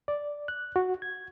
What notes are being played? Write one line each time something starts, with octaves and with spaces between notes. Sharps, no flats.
D5
F#6
F#4
G#6